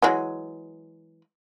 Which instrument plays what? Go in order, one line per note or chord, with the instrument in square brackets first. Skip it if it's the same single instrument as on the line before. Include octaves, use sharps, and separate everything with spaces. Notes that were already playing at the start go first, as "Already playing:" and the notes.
[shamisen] E3 F#3 G#3